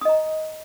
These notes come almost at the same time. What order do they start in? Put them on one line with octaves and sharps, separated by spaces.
D#6 D#5 A#5